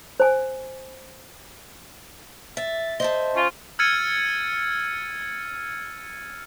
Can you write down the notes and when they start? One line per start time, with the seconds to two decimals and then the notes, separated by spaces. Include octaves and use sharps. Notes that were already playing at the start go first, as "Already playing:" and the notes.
0.20 C5 G#5
2.57 E5 A6
3.00 C5 D#5 E5 A5
3.35 C#4 F4
3.79 E6 F6 G#6 A6 C#7 D#7